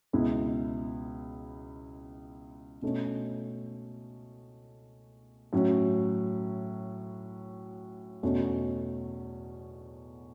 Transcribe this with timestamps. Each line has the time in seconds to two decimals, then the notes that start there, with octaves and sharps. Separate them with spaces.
0.13 C#2 B2 B3 E4
2.82 B2 A3 C#4
5.53 A2 F#3 C#4 F#4
8.23 E2 B2 A3 C#4 F#4